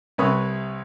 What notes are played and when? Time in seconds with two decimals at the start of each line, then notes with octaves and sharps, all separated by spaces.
0.18 C2 C3 B4 C#5 D#6